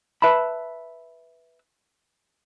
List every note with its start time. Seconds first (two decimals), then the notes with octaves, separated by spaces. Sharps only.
0.22 B4 E5 A5 B5